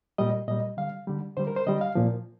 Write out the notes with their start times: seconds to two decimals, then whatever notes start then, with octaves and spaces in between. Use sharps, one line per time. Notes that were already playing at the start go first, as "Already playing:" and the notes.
0.18 A#2 G3 D#5
0.48 A#2 G3 D#5
0.77 D3 G3 F5
1.07 D3 G3
1.37 D3 G3 C5
1.47 A#4
1.56 C5
1.67 D3 G3 D#5
1.81 F5
1.95 A#2 F3